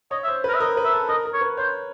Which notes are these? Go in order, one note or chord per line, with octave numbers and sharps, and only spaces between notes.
C#5 D#5
E5
C5
A#4 B4
E5
A#4 D#5
B4
E5
A4
A#4 D#5
A#4
C#5
B4
C5 C#5